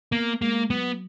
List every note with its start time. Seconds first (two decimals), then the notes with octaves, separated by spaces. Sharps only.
0.12 A#3 B3
0.41 G#3 A#3
0.70 F#3 B3